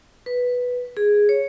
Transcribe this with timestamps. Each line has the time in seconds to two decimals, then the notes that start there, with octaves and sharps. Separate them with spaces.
0.26 B4
0.97 G#4
1.29 C#5